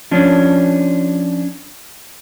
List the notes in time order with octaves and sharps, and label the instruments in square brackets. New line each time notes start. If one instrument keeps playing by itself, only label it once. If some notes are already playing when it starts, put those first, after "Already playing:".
[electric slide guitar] F3 C#4 D4